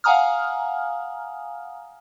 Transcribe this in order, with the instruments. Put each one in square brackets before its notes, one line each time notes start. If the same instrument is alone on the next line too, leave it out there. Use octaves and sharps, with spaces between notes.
[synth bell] F5 F#5 G#5 A#5 D#6 F6